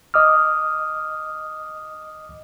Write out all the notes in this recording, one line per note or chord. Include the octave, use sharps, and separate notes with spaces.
D#5 D6 D#6 F6